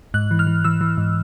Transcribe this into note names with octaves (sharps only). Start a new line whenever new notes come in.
G#2 F#6
E3
F6
E3
E3 E6
E3
G#2